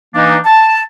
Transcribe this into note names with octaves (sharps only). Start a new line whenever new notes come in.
E3 A#3 D4 D#4
A5